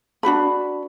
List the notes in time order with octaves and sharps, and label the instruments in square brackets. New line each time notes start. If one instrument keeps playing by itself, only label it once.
[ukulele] D4 F#4 B4 B5